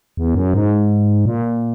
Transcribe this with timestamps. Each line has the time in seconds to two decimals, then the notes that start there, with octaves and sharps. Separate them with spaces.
0.17 E2
0.35 F#2
0.54 G#2
1.25 A#2